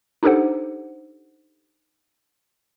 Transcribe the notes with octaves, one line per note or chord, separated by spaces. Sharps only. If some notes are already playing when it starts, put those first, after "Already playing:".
D4 D#4 G4 A4 C5 F#5